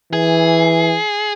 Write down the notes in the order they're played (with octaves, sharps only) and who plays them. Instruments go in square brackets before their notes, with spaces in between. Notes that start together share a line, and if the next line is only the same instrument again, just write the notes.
[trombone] E3 [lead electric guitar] G#4